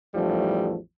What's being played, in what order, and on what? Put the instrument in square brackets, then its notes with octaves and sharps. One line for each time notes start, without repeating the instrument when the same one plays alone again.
[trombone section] A1 E2 F3 G3 A3 D#4